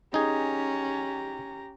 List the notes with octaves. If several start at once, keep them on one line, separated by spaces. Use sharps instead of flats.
C#4 D#4 G4 G#4 A#5